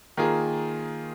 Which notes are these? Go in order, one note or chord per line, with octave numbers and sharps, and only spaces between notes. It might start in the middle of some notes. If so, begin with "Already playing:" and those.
D#3 A#3 F4 G#4